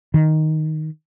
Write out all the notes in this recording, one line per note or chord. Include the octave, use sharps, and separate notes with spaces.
D#3